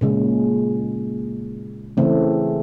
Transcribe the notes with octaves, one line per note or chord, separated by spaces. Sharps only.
A#2 C#3 G#3
C#3 E3 A3 C4